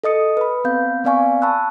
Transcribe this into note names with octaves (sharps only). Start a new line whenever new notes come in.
A4 D#5 D#6 C#7
B4 B5
B3 C4 F5 G6
B3 C4 D5 F5 G#5 C#6
A5 B5 C#6 E6 F#6